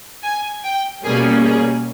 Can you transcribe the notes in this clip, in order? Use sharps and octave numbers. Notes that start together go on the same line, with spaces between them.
G#5
G5
B2 G3 A#3 C#4 G#4
G#4